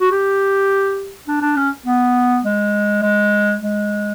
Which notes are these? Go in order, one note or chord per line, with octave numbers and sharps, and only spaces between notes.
F#4
G4
D4
D4
C#4
B3
G#3
G#3
G#3